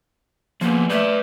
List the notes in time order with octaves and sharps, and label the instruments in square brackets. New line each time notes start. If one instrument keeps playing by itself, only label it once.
[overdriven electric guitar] F3 B3 [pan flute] A#3
[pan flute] A3 [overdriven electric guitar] B4 D5